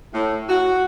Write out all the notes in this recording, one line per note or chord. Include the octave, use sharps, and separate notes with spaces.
A2
F#4